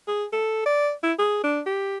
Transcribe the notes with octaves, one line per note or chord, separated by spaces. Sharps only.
G#4
A4
D5
E4
G#4
D4
G4